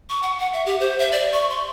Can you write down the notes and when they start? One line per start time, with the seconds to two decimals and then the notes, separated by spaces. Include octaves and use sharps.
0.09 C#6
0.23 F#5
0.39 F#5
0.53 E5
0.66 G4
0.80 C5
0.99 E5
1.12 D5
1.32 C#6
1.50 C6